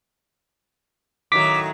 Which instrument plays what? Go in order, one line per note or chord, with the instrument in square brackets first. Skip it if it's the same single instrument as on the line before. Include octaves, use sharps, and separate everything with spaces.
[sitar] A2 D#3 F#3 [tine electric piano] D6 B6